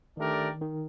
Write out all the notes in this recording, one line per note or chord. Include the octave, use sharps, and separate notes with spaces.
D#3 A3 D4 G4 A#4 D5
D#3